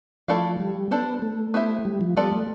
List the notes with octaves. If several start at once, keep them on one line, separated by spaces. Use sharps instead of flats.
F3 A3 E4 A4 D5 F5
G3
B3 D4 A4 C5
A3
B3 E4 G4 C5 E5
G3
F3
G3 B3 F4 A4 D5
A3